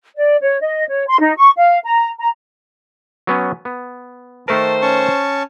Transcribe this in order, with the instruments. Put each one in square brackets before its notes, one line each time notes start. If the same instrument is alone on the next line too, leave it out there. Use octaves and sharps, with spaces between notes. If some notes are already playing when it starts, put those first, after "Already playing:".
[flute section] D5
C#5
D#5
C#5
C6
D#4
C#6
F5
A#5
A#5
[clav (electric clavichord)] F#3 B3 C#4
B3
[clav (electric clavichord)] D#3 A3 A#4 [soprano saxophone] C5 [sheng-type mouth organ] A5
[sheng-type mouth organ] C#4 A5 C#6